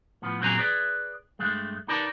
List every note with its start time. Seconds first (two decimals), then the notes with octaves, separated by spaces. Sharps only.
0.22 A2 F3 B3
0.40 F#2 A#2 F#3 C4 G#4 A#5
0.59 G#4 B4 D5
1.39 G2 G#3 A3
1.88 D#4 G4 A#4 B4 D5 A5